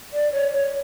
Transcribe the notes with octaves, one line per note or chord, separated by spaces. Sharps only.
D5
C#5
C#5